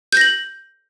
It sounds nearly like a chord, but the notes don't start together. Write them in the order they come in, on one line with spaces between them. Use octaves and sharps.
G6 A#6 F#7